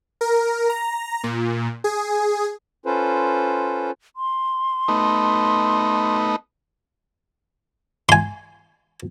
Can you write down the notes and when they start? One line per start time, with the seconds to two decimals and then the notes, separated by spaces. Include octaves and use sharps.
0.21 A#4
0.69 A#5
1.23 A#2
1.84 G#4
2.86 C#4 F4 A4 B4 C5
4.16 C6
4.88 A3 B3 D#4
8.09 G#5 C6